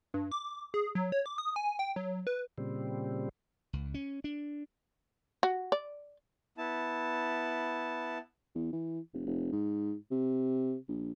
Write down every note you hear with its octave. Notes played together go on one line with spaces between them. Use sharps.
G2
D6
G#4
F#3
C#5
D6
D#6
G#5
G5
F#3
B4
A#2 C#3 G3 C4
C#2
C#4
D4
F#4
D5
B3 E4 A5
E2
E3
F1
F1
G#2
C3
A#1